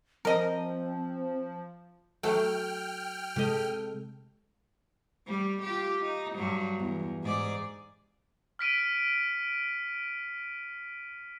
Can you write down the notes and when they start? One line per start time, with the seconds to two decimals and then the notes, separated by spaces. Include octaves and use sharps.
0.25 F3 C4 A#4 D#5
2.23 F#3 A3 G5 F6
3.36 C3 G#3 G4 A4 D#5
5.27 G3
5.62 F4 G4
6.02 D#4
6.35 G2 F#3 G3
6.79 E2
7.23 G#2 G#4 D5
8.59 F6 B6 D7 D#7